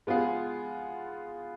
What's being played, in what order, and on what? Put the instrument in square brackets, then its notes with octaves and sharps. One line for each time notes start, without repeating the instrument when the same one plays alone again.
[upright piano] G#3 B3 F4 G#4